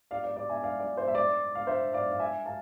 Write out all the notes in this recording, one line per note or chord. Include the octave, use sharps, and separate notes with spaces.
D5 F5
D5
D5
E5 G#5
D5 F5
D5
C5 E5
E5
D5
F5
C5 E5
D5 F5
F5
E5 G#5
F5 A5